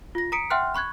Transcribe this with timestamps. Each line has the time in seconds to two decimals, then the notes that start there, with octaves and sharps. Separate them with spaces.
0.15 F4 A#6
0.32 A#5 D#6 B6 C#7 D7
0.50 E5 F#5 G5 C6 F6 F#6
0.74 B5 C#6 F#6 G#6